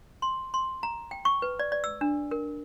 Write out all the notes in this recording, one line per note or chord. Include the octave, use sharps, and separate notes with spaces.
C6
C6
A#5
G5
C#6
B4
D5
D5
E6
D4
A#4